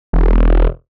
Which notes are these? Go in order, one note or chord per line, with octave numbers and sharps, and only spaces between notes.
E1